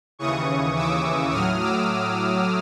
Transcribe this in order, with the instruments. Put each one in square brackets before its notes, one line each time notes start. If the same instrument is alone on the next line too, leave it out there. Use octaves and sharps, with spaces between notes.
[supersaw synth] D#2 C#3 E3 C#6 D#6
D6 E6
A2 F#3 D#6 F6
D6 E6